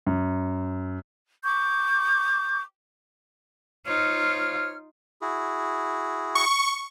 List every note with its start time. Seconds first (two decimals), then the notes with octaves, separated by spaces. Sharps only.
0.06 F#2
1.42 C#6 D6 G6
3.85 F3 D#4 F4 C#5 F6
5.21 E4 F#4 G#4
6.35 C#6